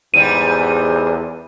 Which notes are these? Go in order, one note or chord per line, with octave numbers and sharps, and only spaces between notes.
E2 G#2 G3 D#7